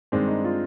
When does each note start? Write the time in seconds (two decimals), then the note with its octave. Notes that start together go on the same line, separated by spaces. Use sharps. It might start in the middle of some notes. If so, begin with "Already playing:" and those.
0.12 G2 D#3 G#3 C4 D4
0.28 D#4
0.44 F4